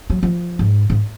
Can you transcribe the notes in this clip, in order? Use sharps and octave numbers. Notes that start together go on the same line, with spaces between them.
F#3
F3
G#2
G#2